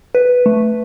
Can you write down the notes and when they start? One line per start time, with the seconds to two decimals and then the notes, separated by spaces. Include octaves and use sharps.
0.15 B4
0.46 A3